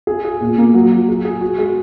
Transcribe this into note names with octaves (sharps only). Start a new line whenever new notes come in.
G#4
G#4
A#2
A#3
F#3
F#3
G#4
G#4
F#4
G#3